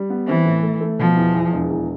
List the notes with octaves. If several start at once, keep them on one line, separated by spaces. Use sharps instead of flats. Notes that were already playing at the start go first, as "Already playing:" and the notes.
Already playing: G3
B3
E3 C4
A2
A3
A3
B2 F3
E2
E2
E1
E2